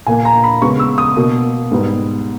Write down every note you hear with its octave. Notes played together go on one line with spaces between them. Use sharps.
A#2 A#3 G#5
A#5
B5
C#3 G#3 B3 C#6
E6
D#6
B2 A#3
G#2 G3 B3